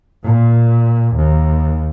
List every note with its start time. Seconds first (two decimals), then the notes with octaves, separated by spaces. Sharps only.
0.22 A#2
1.14 D#2